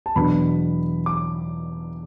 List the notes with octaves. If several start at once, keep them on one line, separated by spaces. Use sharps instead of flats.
A5
E2 B2 F#3 D4 B5
D6